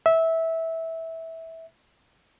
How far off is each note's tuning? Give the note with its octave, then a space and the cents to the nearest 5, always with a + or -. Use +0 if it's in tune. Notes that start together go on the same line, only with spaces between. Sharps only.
E5 -15